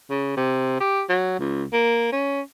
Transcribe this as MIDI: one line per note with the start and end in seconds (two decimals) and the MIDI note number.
0.10 0.34 49
0.37 0.76 48
0.80 1.04 67
1.09 1.36 54
1.40 1.64 37
1.73 2.08 58
2.12 2.41 61